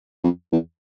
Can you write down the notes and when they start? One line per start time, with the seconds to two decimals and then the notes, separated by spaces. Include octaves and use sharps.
0.24 F2
0.52 E2